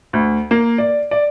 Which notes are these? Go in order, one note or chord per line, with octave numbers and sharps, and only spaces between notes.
D2
A#3
D5
D5